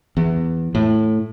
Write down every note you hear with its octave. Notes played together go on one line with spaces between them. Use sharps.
E2
A2